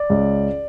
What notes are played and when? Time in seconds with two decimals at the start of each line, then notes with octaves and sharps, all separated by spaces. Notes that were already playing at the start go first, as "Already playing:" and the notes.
Already playing: D5
0.10 C#2